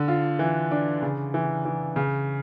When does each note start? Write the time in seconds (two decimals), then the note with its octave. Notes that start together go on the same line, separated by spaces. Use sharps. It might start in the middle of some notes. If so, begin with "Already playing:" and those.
Already playing: D3
0.08 F4
0.39 E3
0.71 D4
1.02 C#3
1.34 E3
1.65 E3
1.96 C#3